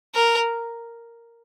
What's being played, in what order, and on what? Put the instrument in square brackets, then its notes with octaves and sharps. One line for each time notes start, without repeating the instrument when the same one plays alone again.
[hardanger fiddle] A#4